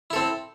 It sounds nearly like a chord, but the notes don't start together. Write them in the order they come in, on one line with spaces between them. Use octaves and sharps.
E4 A4 C4